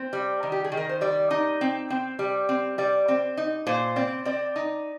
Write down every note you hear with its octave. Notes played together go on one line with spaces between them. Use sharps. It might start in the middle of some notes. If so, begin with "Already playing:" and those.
Already playing: C4
G3
D#3
G4
G#4
D#3
A#4
C5
G3 D5
D#4
C4
C4
G3
C4
G3 D5
C4
D#4
A#2 C5
C4 D5
C4 D5
D#4